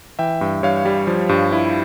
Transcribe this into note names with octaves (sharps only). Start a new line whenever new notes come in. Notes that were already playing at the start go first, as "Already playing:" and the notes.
E3 E5 G5
G2
G2 C#5 F5
G3
F3
G2
E4